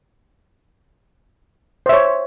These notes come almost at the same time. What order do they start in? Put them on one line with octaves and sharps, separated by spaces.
C5 E5 C#5